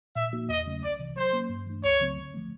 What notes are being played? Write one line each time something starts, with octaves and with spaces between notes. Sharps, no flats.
A#2 E5
F3 A#3 D#4 F#4
E2 D#5
C#3 F#3 A3 C#4
C2 D5
C3 E3
F#3 C5
A#3 C#4
G2
E3 A3 D4
C#2 C#5
C#3 F#3 A3 C4
D3
F3 A3